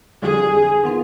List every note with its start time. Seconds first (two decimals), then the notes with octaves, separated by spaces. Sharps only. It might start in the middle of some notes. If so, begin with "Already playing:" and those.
0.22 F2 D3 G3 G#4
0.84 D#3 B3 F4